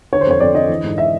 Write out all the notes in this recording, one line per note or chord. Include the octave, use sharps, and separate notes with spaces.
D3 C#5
C5
F2 C#5
F2 D5
D3 D#5
E3
G#2
E5